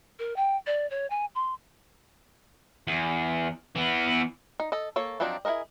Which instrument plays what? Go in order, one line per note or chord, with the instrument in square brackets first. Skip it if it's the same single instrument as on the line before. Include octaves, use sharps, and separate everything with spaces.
[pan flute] A#4
G5
D5
C#5
G#5
C6
[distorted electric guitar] E2
E3 B3
[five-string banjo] D#4
A4 D#5
A#3 A4 C#5
F3 F#3 C4 D4 D#4
E4 F#4 G#4 A#4 D#5